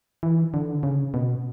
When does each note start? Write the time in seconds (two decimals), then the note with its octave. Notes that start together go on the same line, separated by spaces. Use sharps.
0.23 E3
0.54 D3
0.83 C#3
1.14 B2